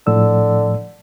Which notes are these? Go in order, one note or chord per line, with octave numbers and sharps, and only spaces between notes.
A2 D3 F3 E6